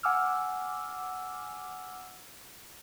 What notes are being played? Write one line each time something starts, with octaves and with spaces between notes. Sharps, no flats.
F#5 G#5 D6 E6 F6